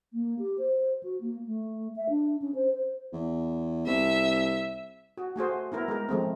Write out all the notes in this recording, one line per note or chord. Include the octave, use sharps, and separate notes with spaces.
A#3
G4
C5
F#4
A#3
A3
E5
D4
C#4
C5
C5
E2
C2 E5
F#4
A3 F#4 G#4 C5
B3 E4 A#4
G#3 A#4
F3 G#3 A3 C4